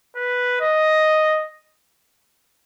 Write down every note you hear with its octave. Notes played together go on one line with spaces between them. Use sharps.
B4
D#5